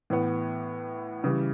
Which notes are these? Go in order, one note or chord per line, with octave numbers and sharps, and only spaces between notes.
A2 E3 B3
C#3 E3 G3